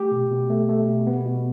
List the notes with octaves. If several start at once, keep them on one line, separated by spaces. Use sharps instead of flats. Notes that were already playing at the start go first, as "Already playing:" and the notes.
Already playing: A3 G4
B2
B2
A3
A3
B2
B3
B2